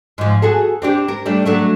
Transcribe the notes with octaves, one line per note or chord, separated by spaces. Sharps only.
G#2 F3
F#4 G#4 A4
C4 D4 G4
A#4
G3 A3 D4
F#3 A3 D4